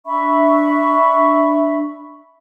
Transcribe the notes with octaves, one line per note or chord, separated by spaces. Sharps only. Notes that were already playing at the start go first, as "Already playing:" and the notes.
D4 E5 B5 C#6